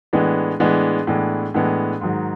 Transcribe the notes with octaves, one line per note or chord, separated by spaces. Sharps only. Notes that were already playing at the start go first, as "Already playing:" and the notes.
A2 E3 G#3 B3 D4
A2 E3 G#3 B3 D4
A2 E3 G#3 B3 D4
A2 E3 G#3 B3 D4
G#2 D#3 F#3